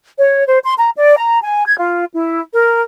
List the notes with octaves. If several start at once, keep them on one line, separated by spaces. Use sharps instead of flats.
C#5
C5
C6
A#5
D5
A#5
G#5
G#6
F4
E4
A#4